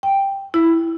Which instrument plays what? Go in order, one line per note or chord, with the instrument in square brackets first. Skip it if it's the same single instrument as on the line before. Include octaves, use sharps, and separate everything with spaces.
[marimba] G5
E4